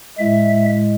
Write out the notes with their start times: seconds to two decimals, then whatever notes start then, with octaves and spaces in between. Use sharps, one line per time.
0.18 A2 G#3 E5